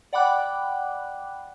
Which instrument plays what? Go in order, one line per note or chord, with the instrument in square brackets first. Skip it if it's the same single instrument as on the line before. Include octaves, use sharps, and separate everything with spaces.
[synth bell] D5 F#5 G5 B5 D6 F#6